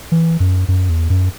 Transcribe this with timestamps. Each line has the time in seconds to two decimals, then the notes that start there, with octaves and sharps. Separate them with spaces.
0.12 E3
0.40 F#2
0.68 F#2
0.89 E2
1.10 F#2